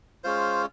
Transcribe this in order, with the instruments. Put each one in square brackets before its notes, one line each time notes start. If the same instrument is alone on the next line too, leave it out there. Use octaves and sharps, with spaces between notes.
[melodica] G#3 C#4 F4 C5